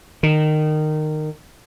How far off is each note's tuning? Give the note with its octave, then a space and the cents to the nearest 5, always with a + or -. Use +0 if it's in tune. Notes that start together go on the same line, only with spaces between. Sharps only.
D#3 -20